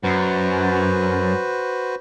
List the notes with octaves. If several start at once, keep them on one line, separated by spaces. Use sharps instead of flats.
F#2 F#4 B4 C5